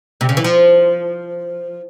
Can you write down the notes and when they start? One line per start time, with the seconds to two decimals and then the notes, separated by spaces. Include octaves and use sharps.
0.21 C3
0.29 C#3
0.37 E3
0.44 F3